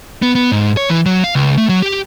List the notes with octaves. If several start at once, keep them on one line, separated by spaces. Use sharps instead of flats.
B3
B3
G#2
C#5
E3
F#3
F5
C#2
A3
F#3
G4